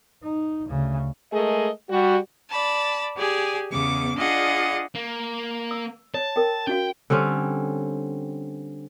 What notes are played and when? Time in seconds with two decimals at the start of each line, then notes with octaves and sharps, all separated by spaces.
0.22 D#4
0.68 D2 C#3
1.32 G#3 A3 G#4 A#4 D#5
1.90 G3 F#4
2.52 D5 A5 B5
3.16 G4 G#4 D5 G#5
3.71 E2 C#3 B3 D6
4.16 D4 F4 G#4 D5 D#5 F#5
4.95 A#3
5.71 E6
6.14 C#5 A5
6.36 A#4 G5
6.67 C#4 F#4 F5 G5
7.10 D3 G3 C4 C#4